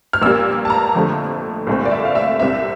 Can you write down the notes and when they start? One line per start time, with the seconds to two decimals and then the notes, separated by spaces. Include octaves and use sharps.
0.13 F6
0.22 A#1 A#2 G3 A#3 E6
0.65 A5
0.70 A#5
0.95 F2 D3 F3 A3
1.67 C2 A#2 A3 C4
1.85 D5
1.91 E5
2.05 F5
2.15 E5
2.40 C2 C3 G3 C4 E5